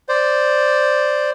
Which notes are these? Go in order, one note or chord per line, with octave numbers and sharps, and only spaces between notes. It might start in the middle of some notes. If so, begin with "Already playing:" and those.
C5 D5